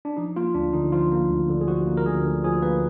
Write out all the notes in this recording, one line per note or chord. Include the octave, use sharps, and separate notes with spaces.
D4
F3 D#4
A#3 F4
D2 D4
D3 D#4
F3 F4
A#3
D2
D3
G#4
F3 F#4
A#3
A#4
D2 G#4
D3
F3 G#4
A#3 B4